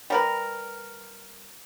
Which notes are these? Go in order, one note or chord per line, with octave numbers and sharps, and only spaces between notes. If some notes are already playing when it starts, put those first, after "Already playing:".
G3 A#4 B4